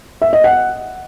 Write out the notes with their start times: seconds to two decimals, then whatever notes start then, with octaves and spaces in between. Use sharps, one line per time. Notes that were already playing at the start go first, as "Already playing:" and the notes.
0.22 E5
0.33 D#5
0.44 F#5